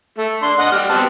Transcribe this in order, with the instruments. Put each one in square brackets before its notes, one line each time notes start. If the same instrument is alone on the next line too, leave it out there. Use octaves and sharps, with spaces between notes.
[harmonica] A3
D4 C6
D#5 F#5
G3 F6
B3 C4 A5